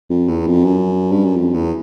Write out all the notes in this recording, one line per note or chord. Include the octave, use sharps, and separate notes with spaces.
F2
E2
F2
F#2
G2
F#2
F2
E2